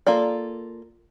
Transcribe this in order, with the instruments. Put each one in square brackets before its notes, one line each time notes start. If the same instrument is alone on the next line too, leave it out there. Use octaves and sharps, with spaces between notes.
[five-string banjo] A#3 F4 A4 D5